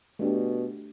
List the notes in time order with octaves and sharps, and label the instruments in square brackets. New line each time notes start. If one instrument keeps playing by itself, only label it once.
[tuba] B2 [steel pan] A3 D4 G4